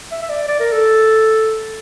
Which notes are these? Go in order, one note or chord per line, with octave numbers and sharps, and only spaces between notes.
E5
E5
D5
D5
A#4
A4